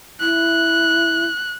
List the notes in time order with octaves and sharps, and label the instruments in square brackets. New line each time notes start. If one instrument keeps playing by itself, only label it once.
[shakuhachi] E4 [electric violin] F#6